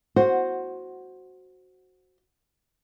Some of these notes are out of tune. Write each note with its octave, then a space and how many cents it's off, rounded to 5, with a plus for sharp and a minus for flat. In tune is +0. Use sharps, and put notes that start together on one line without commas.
F#4 +0 C5 +10